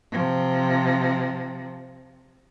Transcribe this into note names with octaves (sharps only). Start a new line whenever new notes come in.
C3 F3